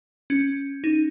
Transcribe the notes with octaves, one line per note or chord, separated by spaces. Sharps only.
C#4
D#4